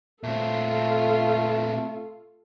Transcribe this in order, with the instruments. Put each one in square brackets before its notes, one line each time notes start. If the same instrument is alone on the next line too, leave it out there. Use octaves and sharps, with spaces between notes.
[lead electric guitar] A#2 C4 [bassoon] A3 [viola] F4 A4